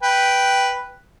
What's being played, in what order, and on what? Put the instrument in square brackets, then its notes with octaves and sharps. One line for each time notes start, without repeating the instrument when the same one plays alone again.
[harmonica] B4 G5